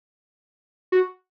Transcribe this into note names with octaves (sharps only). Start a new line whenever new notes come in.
F#4